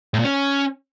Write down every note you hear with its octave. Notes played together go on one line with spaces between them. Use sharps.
A2
A#2
C#4